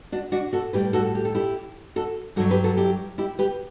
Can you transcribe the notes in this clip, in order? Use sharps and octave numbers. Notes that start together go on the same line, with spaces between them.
D4 F#4
D4 F#4
F#4 A4
A2 G3 G4 B4
F#4 A4
G4
A4
E4 G4
F#4 A4
G2 F#3 F#4 A4
G4 B4
F#4 A4
E4 G4
E4 G4
G4 B4